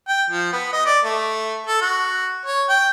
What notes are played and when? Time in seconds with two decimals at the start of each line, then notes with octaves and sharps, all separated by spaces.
0.08 G5
0.30 F3
0.53 B3
0.73 D#5
0.86 D5
1.04 A3
1.66 A4
1.81 F#4
2.46 C#5
2.69 G5